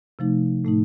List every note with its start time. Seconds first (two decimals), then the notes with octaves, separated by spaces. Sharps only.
0.19 C3 F3 A3 D#4
0.65 A2 A3 D#4